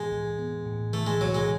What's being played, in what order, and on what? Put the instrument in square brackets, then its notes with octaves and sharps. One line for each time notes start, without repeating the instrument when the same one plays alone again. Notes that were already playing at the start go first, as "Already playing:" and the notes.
Already playing: [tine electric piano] A2 E3 B3 [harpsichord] G#3
[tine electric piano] B1
B3
A2
[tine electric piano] E3 [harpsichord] A3
[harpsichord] G#3
[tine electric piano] B1 [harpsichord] F#3
[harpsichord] G#3